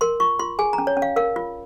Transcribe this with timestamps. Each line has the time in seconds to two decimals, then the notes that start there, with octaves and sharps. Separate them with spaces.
0.01 A#4 C6
0.20 F4 C#6
0.39 F4 C6
0.59 G#4 G#5
0.73 A#5
0.78 C#4
0.87 C#5
0.97 C#4
1.02 F5
1.16 A#4 F5
1.36 F4